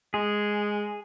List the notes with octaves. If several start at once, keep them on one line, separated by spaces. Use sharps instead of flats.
G#3 G#4